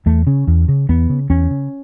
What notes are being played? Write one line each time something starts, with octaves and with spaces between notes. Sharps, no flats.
E2 A3
C#3 C#4
E2
C#3
E2 B3
C#3
E2 C#4
C#3